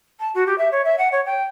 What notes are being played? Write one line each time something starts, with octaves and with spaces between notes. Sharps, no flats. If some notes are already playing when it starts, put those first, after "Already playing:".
A5
F#4
G4
E5
C#5
E5
F#5
C#5
G5